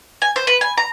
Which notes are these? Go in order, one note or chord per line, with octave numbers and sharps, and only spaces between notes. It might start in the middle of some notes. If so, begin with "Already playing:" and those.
G#5
C5
B4
G#5
A#5